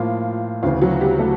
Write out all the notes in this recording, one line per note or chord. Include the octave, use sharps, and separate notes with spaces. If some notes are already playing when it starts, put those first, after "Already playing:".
Already playing: A2 F3 A#3 F4
D2 C#3 E3 F4
F#3 F#4
G3 G4
A3 A4